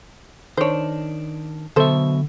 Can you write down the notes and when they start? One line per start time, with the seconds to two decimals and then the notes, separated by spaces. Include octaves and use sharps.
0.57 D#3 D4 C5 C#5
1.76 B1 B2 D3 A4 C5 E5